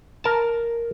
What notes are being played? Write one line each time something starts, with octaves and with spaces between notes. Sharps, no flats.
A#4 A5